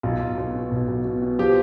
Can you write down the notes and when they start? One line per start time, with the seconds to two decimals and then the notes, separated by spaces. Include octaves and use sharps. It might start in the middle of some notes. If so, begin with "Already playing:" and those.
0.03 B1 F4
0.20 B1
0.38 B1
0.54 B2
0.71 B1
0.88 B1
1.05 B2
1.22 B2
1.39 F3 G4